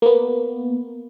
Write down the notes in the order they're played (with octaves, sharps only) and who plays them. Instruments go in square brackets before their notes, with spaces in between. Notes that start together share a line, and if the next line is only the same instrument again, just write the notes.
[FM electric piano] A#3 B3